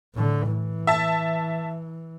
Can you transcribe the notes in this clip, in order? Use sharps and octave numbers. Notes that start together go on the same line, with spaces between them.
A2 D3
E3
E5 A5